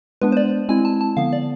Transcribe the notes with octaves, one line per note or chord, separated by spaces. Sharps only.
G#3 B3 D4 B4
C5
D5
G#3 C4 E4 G#5
A5
A5
D3 F3 B3 F5
D5